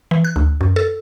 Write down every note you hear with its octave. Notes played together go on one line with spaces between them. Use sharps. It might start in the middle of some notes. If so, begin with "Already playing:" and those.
E3
F#6
D2
F#2
A4